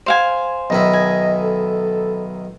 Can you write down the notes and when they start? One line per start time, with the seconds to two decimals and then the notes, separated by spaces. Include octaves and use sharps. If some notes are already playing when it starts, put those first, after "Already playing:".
0.06 C5 F5 G#5
0.70 B1 D#3 E4 D#5
0.93 G#5
1.41 A4